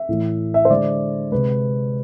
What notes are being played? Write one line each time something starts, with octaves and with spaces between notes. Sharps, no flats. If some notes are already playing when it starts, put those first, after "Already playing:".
Already playing: E5
A2 E3 A3
E5
C5
D3 G#3 D5
C3 G#3 B4